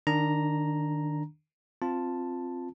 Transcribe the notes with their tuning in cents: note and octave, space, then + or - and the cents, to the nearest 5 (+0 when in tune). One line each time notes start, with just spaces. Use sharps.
D#3 -25 D4 +0 A#5 +0
C4 +0 F4 +0 A5 +0